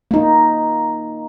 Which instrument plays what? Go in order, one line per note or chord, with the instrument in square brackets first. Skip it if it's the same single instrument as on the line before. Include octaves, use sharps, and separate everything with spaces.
[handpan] A#3 D#4